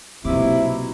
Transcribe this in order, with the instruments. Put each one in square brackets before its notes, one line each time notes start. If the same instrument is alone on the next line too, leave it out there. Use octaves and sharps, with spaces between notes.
[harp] B1 D6 [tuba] C3 [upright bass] A#3 [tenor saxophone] E4